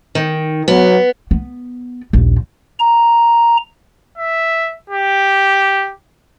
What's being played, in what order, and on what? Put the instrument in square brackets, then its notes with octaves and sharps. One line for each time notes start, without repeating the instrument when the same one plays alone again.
[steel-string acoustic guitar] D#3
[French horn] F#3 [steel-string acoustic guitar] B3
[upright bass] B3
A#1 D#2
[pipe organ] A#5
[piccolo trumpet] E5
G4